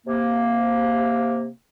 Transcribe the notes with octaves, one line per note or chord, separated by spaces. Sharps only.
C3 A#3